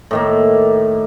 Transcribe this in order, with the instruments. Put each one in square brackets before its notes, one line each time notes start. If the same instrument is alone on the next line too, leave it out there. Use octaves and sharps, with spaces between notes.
[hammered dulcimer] A2 D#3 A#3